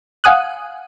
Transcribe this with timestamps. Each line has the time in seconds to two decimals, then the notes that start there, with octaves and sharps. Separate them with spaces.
0.24 F5 F#5 G#5 D#6 F#6